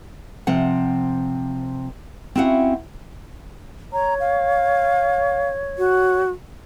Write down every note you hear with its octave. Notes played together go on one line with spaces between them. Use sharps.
C3 F3 C4 F#5
C4 C#4 E4 F#4 F5 F#5
C#5 A#5
F5
F#4